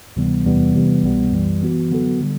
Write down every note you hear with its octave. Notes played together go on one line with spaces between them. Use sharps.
D2 C3 E3 G3 B3
E2 C3 E3 G3 B3
C3 E3 G3 B3
C2 B2 G3 B3
F#2 E3 G3
E3 B3 F#4
D3 F#3 B3 F#4 A4
D3 G3